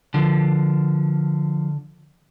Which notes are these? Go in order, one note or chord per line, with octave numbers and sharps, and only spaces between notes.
D3 F3